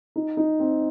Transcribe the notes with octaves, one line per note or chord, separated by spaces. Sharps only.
D#4
D#4
C4